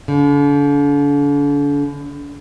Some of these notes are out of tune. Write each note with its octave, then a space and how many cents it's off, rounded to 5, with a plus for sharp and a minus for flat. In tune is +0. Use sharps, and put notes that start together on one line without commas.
D3 -40